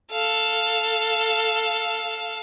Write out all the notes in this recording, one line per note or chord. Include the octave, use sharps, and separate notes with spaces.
A4 F5